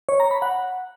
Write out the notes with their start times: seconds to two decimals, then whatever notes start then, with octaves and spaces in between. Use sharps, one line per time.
0.09 C#5
0.20 A#5
0.31 B5
0.42 F#5